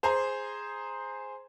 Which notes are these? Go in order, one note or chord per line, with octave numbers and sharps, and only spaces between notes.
G#4 C5 G#5 A#5